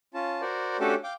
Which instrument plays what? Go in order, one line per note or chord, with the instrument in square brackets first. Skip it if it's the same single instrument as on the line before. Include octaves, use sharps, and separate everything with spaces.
[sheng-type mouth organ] C#4 F4 A5
F#4 A#4 C5 D5
A3 C#4 D4 F#4 G4 A4
F5 G5 D6